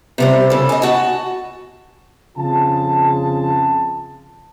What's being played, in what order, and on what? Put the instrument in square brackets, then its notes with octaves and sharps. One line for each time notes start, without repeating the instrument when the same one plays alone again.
[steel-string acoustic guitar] C3 G3 C5
C#3 A4
D#5 G#5
F#4 A5
[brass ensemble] F2 C#3 F4 G#4 A5